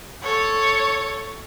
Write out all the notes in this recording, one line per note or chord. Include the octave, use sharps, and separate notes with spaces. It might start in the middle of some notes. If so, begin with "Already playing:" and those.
A4 C#5